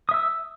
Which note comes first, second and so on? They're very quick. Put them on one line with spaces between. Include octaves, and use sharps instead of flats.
D#6 E5 E6